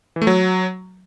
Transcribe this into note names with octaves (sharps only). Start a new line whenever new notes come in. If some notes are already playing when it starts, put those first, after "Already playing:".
E3
A3
F#3